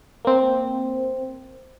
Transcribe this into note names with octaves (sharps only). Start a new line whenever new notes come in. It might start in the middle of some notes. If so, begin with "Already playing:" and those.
A#3 C4